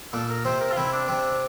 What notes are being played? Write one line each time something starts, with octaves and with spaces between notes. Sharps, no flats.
A#2 A#3 A4
A#4
C3 C4 C5
A#4
F4
C3 C4 E4
D4
C3 C4